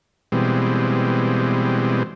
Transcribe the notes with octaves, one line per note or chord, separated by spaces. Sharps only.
B2 E3 G3 G#3 C4